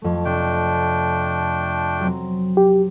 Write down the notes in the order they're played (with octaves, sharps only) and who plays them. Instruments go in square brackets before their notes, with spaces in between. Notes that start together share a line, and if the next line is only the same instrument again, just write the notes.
[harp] F2 A3
[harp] C3 [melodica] A3 D4 G5
[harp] F#3 C4
[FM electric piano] G4